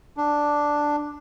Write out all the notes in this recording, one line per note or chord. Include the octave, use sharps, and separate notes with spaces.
D4